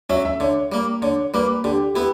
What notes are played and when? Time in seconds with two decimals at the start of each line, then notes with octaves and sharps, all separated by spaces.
0.10 F#3 C#4 E5
0.25 E5
0.40 D3 C#5
0.72 G3 A#3
1.02 D3 C#5
1.34 G3 A#3 B4
1.64 D3 G4
1.95 B3 E4 G4